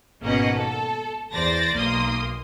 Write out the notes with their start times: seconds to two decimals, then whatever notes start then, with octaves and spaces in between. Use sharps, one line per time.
0.22 G#1 B2 A#3 C#4 D#5 F#5
0.56 A4
1.33 E2 C5 D5 A6 A#6
1.73 B1 A#3 C6 D#6